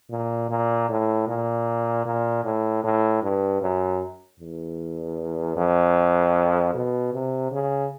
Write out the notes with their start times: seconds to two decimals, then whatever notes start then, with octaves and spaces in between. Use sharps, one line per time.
0.11 A#2
0.49 A#2
0.89 A2
1.28 A#2
2.06 A#2
2.45 A2
2.84 A2
3.23 G2
3.62 F#2
4.40 E2
5.56 F2
6.74 B2
7.13 C3
7.52 C#3